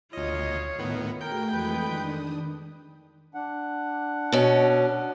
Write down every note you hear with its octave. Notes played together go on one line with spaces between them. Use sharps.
D2 F4 C#5 D#5
A2 D#3 B3
A3 F#4 G#4 A#4 G5 G6
F2 E3 G#3 A4 B4
D#3 D4 D#6
D4 F#5
B2 C#4